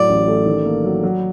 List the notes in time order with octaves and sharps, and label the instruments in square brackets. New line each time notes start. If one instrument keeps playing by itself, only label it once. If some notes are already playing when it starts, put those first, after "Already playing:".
Already playing: [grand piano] A2 F#3 [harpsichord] D5
[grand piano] A1
A3
D#3
A#3
F#3
F#3